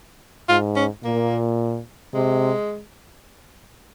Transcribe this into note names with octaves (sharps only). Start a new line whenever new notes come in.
G#2 F4
C#4
A#2 A#3
C3 G#3